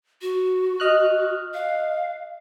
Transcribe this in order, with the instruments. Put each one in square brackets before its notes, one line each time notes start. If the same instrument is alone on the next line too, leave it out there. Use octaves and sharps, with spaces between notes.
[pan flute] F#4
[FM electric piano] D#5 F6 F#6
[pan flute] F5